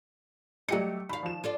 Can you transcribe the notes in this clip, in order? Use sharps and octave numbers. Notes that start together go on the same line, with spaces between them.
F#3 A3 G4 D#5 C#7
D#3 F5 B5
F3 E7
F4 A4 D5